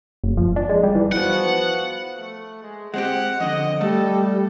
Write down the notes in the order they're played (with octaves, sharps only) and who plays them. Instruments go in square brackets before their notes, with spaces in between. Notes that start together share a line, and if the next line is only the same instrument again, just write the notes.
[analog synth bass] F#1
F3
D4
G#3
G3
E3
[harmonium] F3 B3 F#4 [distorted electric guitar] F#5
[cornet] A3
G#3
[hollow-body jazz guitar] G#3 C4 G4 [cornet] F#5
[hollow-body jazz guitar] F2 D3 [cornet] D#5
[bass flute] G3 [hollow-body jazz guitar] A3 [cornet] A4